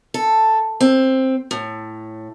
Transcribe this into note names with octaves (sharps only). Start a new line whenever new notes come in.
A4
C4
A2